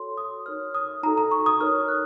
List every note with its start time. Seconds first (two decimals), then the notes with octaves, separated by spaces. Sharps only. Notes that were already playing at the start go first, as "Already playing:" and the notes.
Already playing: F#4 A4 C#5 C6
0.17 D#6
0.46 D#4 A#4 C#5 F6
0.75 D#6
1.03 D#4 F#4 A4 A#5
1.18 A#5
1.31 C#6
1.46 D#6
1.60 D#4 A#4 C#5 F6
1.88 F#6